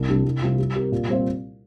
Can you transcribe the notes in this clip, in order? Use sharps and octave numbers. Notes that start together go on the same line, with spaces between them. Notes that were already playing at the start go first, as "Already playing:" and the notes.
Already playing: C2
C3 G3 D4
C2
C3 G3 C4 F4
G3
C4 G4 A#4
A#2
G3 C4 F4 C5